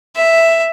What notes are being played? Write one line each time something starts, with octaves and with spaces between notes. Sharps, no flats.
E5